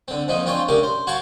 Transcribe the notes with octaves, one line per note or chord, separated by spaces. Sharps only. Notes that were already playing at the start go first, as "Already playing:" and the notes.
D3 C4
F2 D#3 F3 A#3 D#4
C4 D4 F4 C#5 G5 G#5
C#3 A3 D4 G4 A#4
C5
F#4 C#5 F5 G5 A5 C#6